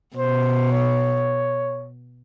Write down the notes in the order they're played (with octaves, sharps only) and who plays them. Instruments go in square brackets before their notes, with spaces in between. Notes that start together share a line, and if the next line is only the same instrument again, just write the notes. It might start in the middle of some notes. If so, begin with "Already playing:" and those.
[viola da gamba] B2 [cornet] C5
[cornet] C#5